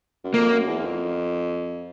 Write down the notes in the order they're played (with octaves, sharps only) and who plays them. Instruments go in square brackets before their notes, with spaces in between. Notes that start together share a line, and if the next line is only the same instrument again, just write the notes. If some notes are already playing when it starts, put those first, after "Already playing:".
[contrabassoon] F#2
[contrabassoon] F2 [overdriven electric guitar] A#3
[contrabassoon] F#2
E2
E2
F2